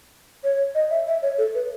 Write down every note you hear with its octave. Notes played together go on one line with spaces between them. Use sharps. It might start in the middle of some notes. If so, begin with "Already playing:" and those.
C#5
D#5
E5
E5
C#5
A4
B4